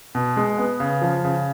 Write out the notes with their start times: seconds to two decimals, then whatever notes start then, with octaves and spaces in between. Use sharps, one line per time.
0.15 B2
0.37 G#3
0.58 B3
0.80 C#3
1.02 F3
1.25 C#3